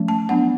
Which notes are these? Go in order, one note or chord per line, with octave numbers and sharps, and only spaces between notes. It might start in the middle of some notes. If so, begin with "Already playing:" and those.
Already playing: F3 A3 C#4
A5
F#3 B3 D4 F#5